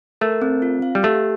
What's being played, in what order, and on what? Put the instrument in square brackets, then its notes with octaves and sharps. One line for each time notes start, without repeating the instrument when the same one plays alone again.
[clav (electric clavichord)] A3 [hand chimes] A#4
[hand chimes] C4
F4
F5
[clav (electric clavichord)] G3
[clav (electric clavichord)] A3 [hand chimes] G4